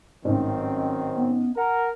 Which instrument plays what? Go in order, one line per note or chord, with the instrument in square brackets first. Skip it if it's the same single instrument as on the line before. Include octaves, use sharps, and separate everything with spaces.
[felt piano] A1 G#2 [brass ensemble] D#3 F#3 C4
[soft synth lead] B3
[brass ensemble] A#4 [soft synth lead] F#5